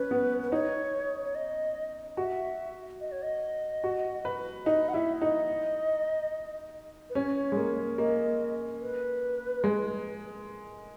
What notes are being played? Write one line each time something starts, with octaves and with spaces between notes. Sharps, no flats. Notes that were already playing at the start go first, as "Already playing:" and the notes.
Already playing: C#4 B4
B3
B4
D#4 C#5
C#5
D#5
F#4 E5
D#5
C#5
D#5
F#4
B4
D#4 D#5
F#5
E4 E5
D#4 D#5
B4
C#4 C#5
G#3
A#3
A#3 D#5
B4
G#3